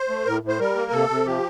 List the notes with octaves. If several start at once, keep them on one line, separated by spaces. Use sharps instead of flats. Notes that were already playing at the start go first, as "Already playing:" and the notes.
Already playing: C5
A3
A2 A#4
A2
C5
G3 A#4
A#3
C3 A4
C3
F3 G4